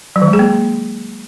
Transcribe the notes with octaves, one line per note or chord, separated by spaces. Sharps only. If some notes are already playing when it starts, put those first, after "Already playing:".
F#3
D#3
G#3
G#4
A#3